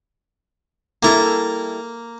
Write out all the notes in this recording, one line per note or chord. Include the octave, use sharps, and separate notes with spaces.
G3 A#3 E4 A4 A#5